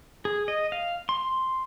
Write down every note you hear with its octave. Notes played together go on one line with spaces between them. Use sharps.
G#4
D#5
F5
C6